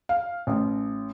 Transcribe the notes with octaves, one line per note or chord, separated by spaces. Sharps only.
F5
A1